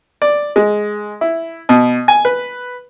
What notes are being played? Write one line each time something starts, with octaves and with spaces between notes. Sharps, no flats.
D5
G#3
E4
B2
G#5
B4